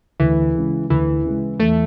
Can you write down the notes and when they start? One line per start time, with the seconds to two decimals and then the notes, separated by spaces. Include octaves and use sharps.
0.20 D2 E3
0.55 C#3 G#3
0.90 D2 E3
1.25 C#3 G#3
1.60 E2 A3